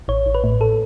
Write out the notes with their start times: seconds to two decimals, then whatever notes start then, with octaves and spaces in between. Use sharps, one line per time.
0.08 A1 C#5
0.26 A1
0.35 B4
0.44 A2
0.61 A4